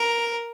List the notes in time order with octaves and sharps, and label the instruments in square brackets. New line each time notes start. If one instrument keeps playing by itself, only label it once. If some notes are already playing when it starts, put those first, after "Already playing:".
Already playing: [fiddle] A#4